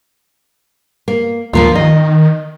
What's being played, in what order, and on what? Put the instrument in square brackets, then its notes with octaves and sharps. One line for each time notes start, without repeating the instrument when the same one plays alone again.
[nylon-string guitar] A#3
[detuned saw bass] D2 [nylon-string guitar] F3 A#3 F4
[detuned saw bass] D#3 [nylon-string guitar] D#5